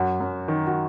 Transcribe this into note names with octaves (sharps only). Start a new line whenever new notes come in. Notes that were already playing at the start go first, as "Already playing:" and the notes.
Already playing: F#2 F#4
F#2
D#3
F#4